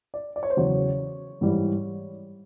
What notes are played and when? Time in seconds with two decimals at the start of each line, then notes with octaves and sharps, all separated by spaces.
0.14 D5
0.36 D5
0.43 C#5
0.50 C5
0.57 E2 C#3 F#3 C#5
1.41 G#2 E3 G3